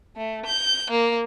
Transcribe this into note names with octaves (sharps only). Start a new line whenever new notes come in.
A3
G6
A#3